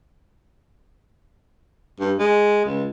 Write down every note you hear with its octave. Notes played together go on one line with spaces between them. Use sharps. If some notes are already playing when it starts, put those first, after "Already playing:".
G2
G#3
C#2